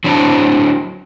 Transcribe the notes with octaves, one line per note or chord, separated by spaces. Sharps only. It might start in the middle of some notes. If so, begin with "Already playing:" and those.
F#3 D4 E4 C5 A5